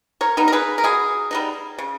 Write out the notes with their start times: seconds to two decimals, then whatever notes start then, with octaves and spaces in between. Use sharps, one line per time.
0.21 A#4 C#5
0.37 G3 B3 D#4
0.48 A#4
0.52 G#4 B4
0.78 A#4
0.84 B2 G#4
1.31 G3 B3 D#4
1.78 C#3